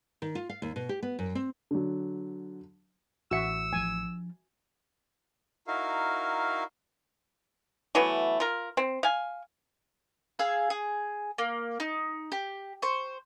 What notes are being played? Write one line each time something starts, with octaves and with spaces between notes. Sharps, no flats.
D#3
F4
F5
D#2
B2
G4
B3
F#2
C4
D3 F#3
A1 F#4 E5 E6 C#7
F3 D4 G#5
D#4 E4 F#4 A#4 F5
E3 F#3 A3 B3
F4 A#4
C4
F5 G#5
G#4 F5 E6
G#4
A#3
D#4
G4
C5 C#6